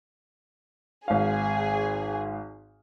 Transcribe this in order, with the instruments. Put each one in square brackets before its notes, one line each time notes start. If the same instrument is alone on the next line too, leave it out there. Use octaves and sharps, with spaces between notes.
[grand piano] G#1 F5 [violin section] G#4